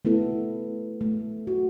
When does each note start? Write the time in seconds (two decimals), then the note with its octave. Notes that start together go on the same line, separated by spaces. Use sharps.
0.05 A3 B3 E4 A4
1.01 A3
1.47 F#4